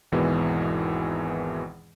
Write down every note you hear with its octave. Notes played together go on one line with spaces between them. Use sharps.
G#1 E2 B2 D#3 E3 G#3